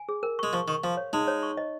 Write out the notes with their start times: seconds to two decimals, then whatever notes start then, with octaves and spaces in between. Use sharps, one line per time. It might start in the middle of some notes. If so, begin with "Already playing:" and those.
Already playing: G#5
0.09 G#4
0.23 A#4
0.39 G#3 C#6
0.53 F3 C#6
0.68 D#3 C#6
0.84 F3 F5
0.97 C#5
1.13 G#3 D#4
1.28 C#5
1.43 C#6
1.57 D#5